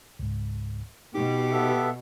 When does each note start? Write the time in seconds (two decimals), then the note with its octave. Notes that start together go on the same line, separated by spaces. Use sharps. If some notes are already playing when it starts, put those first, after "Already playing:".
0.19 C#2 G#2
1.15 B2 D#4 G4
1.51 B3 A4 E5